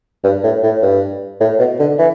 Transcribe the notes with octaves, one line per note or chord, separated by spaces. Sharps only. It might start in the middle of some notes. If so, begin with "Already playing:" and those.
G2
A2
A2
G2
A2
B2
D3
E3